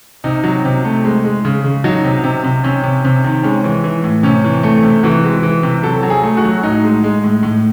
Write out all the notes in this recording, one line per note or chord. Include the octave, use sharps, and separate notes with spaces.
C3 D#4
F#3
C3
A3
G#3
G#3
C#3
C#3
F#3 D#4
C3
C3
C3
C3 C#4
C3
C3
D#3
G#3 C#4
E3
E3
A2
C3 C#4
E3
A3
C3
E3 F#4
G#3
E3
C3
F#3 A4
F#3
G#4
A3
F#4
F#3
A2 D#4
G#3
G#3
A2
A2